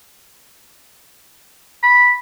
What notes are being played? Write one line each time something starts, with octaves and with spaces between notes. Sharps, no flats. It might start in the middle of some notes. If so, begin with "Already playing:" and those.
B5